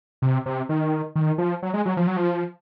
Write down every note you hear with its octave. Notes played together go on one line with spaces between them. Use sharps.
C3
C3
D#3
D#3
F3
F#3
G#3
F#3
F3
F#3
F3